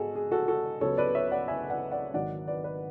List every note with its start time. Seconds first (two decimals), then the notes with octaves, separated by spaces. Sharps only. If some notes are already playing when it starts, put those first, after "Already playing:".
Already playing: G#2 B3 F#4 G#4 A4
0.15 G#4
0.32 F#4 A4
0.48 F#4 A4
0.81 C#2 C#3 F#3 B3 A4 C#5
0.97 B4 D5
1.15 C#5 E5
1.32 D5 F#5
1.48 E5 G#5
1.70 D5 F#5
1.92 D5 F#5
2.14 G#1 G#2 F#3 D5 F#5
2.47 B4 D5
2.64 B4 D5